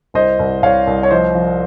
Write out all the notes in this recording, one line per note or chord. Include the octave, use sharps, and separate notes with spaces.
C2 C5 D#5
C2
C2 C#5 F5
C2
C#5
F3 C5 D#5
F3